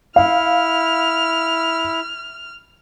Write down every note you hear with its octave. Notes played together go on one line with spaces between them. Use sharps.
E4 F5 F6